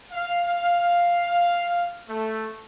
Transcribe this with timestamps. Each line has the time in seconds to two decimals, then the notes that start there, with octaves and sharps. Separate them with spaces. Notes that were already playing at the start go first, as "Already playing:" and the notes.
0.12 F5
2.08 A3